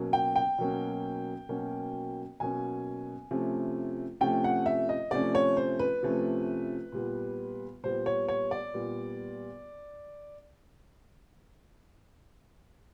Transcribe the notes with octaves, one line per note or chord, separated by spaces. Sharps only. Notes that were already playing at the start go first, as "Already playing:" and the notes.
Already playing: B2 F#3 A#3 C#4
G5
G5
B2 F#3 A#3 C#4
B2 F#3 A#3 C#4
B2 F#3 A#3 C#4 G#5
C3 F3 A3 C#4
C3 F3 A3 C#4 G5
F#5
E5
D#5
C3 F3 A3 C#4 D5
C#5
C5
B4
C3 F3 A3 C#4
A#2 G3 B3
A#2 G3 B3 C5
C#5
C#5
D5
A#2 G3 B3